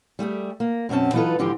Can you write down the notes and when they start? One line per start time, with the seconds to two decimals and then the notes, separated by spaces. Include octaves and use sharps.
0.19 G3 A3 G4 G#4
0.60 A#3
0.89 F#2 B2 C4 C#4 A5
1.13 E3 F#3 D#4 F4 A4 B4
1.39 G#2 D3 E3 F3 F4 G4